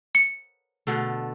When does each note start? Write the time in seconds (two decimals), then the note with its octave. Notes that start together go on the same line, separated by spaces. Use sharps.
0.15 C#7
0.87 B2 D3 A3